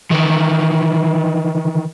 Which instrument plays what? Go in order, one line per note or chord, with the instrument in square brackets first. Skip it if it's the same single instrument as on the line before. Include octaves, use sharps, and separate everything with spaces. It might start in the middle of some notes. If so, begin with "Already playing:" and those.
[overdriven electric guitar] D#3 E3